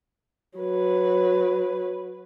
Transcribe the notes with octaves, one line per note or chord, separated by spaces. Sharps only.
F#3 B4